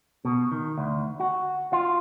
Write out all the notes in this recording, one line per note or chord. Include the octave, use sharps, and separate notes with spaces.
B2
D#3
D2
F#4
F4